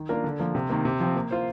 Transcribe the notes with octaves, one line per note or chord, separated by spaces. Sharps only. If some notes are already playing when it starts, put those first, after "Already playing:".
Already playing: D#3
A#3 D4 F4 A#4
D3
F3 A#3
C3
D#3 A#3
C3
F3 C4
A#3
F4 C5